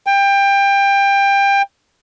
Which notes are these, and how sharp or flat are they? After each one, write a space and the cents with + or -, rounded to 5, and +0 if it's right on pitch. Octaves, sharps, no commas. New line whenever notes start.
G5 +25